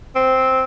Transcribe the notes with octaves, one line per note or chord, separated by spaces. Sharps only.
C4